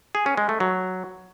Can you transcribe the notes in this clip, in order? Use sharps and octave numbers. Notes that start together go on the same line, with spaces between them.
G#4
C#4
G#3
A3
F#3